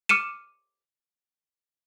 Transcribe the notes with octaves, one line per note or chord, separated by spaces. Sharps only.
D6 F6 C#7 D#7 E7